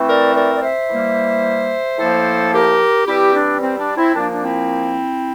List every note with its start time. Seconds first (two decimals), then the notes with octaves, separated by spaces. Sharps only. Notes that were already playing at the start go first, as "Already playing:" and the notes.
Already playing: E3 A3 C4
0.08 A#4 D5
0.35 A#4 D5
0.55 D5
0.62 C5 E5
0.90 E3 G3 A#3
1.98 A2 F3 A#3 A4 C5
2.53 G4 A#4
3.06 E3 G3 C4 E4 G4
3.34 D4
3.61 C4
3.79 D4
3.97 C4 E4
4.15 A#2 F3 A#3 D4
4.32 D4
4.42 C4 E4